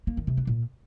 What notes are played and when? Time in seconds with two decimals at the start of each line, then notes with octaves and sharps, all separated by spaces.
0.07 A#3
0.17 D#3
0.27 C3
0.37 D4
0.47 A#2